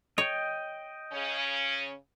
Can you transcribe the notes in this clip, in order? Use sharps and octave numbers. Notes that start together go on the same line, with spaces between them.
C#5 D#5 G5
C#3 C#4